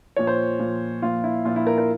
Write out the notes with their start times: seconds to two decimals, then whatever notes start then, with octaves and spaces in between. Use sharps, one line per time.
0.16 A#2 F3 C#5
0.27 C5
0.59 A#2 F3
1.02 A#2 F3 F4
1.24 E4
1.45 A#2 F3 F4
1.56 E4
1.67 A#4
1.78 A#4